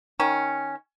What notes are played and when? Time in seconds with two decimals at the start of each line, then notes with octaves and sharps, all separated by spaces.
0.20 D#3 C#4